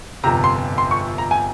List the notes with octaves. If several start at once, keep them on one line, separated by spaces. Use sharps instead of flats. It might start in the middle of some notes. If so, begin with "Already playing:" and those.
G1 F2 C3 A#5
C6
C6
C#6
A#5
G#5